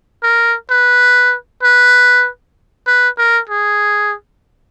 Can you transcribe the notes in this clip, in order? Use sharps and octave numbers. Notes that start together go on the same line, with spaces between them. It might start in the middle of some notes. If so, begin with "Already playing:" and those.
A#4
B4
B4
B4
A#4
G#4